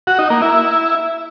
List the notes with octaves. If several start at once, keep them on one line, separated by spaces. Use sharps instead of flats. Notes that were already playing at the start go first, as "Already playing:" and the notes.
F#4
D#4
A#3
E4